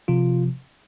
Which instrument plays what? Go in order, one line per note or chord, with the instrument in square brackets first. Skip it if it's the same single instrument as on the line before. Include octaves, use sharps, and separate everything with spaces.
[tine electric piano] C3 F3 F4